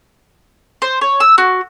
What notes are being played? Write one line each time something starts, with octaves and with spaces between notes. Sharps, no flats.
C5
C#5
E6
F#4